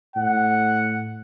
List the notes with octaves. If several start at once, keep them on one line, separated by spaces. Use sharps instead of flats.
A2 F#5